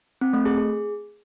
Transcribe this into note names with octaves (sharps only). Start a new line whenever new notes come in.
C4
A3
G#4
G#4